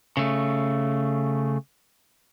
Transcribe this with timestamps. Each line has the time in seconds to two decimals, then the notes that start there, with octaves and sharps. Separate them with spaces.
0.17 C#3 A3